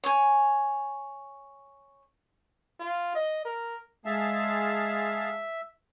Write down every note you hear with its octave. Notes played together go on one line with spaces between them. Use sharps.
C#5 G#5
F4
D#5
A#4
G#3 G#4 E5 F5 A5